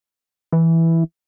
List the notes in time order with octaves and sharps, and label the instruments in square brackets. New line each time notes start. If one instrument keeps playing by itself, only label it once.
[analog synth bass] E3